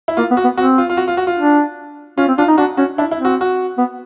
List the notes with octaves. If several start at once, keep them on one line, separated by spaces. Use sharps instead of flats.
E4
A#3 F4
B3
F#4
B3
C4 F#4
F4
F4
F#4
F4
F#4
F4
D4
C#4 F4
C4
D4 F4
D#4
D4 F#4
C#4 F#4
D4 E4
E4
C4
F#4
F#4
B3